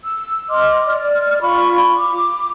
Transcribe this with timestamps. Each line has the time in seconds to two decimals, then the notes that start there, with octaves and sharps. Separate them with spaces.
0.03 E6
0.49 D#5 C6 D6 F6
0.85 D5 F6
1.41 F4 B5 C#6
1.96 D6